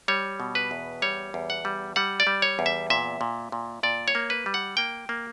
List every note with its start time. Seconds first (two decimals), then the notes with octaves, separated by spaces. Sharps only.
0.08 G3 C#5
0.40 B2
0.55 B4
0.71 E2
1.02 G3 C#5
1.34 E2
1.50 F#5
1.65 G3
1.96 G3 F#5
2.20 D5
2.27 G3
2.42 C#5
2.59 E2
2.66 E5
2.90 A#2 E5
3.21 A#2
3.52 A#2
3.83 A#2 D5
4.08 C#5
4.15 A#3
4.30 B4
4.46 G3
4.54 F#5
4.77 A#3 G5
5.09 A#3